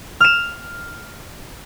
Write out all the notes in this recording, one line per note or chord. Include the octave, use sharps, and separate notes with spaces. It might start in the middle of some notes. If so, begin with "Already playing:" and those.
F6 E7